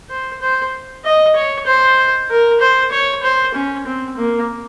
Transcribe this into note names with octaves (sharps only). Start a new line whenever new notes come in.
C5
C5
D#5
C#5
C5
A#4
C5
C#5
C5
C#4
C4
A#3